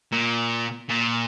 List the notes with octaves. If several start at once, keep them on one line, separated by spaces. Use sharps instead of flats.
A#2
A#2